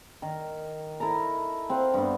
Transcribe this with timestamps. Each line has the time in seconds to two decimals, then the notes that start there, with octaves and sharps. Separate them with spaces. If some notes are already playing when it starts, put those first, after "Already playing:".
0.22 D#3
1.00 E4 A4 A#4 A#5
1.70 C4 F5 F#5
1.94 G2 B3